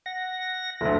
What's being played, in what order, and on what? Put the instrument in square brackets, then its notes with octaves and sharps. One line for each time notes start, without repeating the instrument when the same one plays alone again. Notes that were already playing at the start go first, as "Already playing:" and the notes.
[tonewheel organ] F#5 A#6
[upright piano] F#1 D2 [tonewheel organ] A4